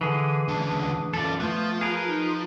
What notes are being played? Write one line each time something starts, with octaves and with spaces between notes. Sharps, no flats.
D3 E3 G#4
C#2 D3 D4
F#2 E3 F4 A4 D5
F3 A3 B3 F4
G#4 A#4 B4
D#4